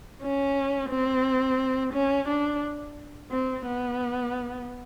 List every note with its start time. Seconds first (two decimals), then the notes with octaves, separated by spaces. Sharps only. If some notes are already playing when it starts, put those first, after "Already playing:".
0.22 C#4
0.90 C4
1.93 C#4
2.28 D4
3.31 C4
3.66 B3